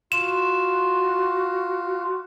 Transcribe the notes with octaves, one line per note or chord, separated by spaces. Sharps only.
F4 F#4 E7